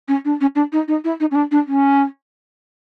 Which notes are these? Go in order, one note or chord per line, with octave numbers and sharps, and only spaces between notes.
C#4
D4
C#4
D4
D#4
D#4
E4
D#4
C#4
D4
D4
C#4